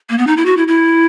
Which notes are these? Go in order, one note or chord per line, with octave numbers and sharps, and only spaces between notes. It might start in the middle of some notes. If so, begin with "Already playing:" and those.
A#3
B3
D#4
E4
F#4
E4
E4